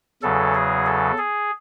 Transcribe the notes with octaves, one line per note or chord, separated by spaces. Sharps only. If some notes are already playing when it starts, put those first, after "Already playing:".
E2 C#3 F#3 A4
G#4
A4
G#4